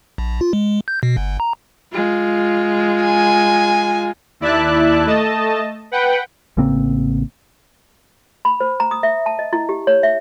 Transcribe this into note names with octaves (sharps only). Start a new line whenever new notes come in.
A#1
F4
G#3
G6
B2
G1
A#5
G#3 F4
G#5
D#2 E4 D5 E5 A5 F#6
A3 D#5 A5
B4 F#5 G5
A1 C#3 A#3 C4
B5
C5
A#5
D#6
E5
A5
D#5
E4
G4
C#5
E5